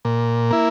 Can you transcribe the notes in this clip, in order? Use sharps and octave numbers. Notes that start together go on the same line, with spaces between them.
A#2
A#3 E4